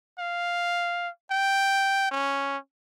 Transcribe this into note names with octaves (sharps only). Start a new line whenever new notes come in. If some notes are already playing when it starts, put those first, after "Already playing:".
F5
G5
C#4